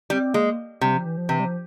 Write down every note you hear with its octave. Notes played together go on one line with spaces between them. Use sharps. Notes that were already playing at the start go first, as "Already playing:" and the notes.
G3 C4
G#3 A#3
C3 G3
F3
E3
F3
C3 E3
G3
F3